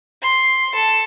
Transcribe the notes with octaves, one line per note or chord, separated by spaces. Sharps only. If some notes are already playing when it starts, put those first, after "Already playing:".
C6
A4